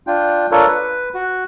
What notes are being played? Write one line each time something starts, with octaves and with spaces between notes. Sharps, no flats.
D4 F4 G5
D4 F4 A4 A#4 C#5
B4
F#4